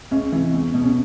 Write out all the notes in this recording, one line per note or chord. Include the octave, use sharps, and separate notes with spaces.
C#2 C#4
C3 E3
E2
B2
C#4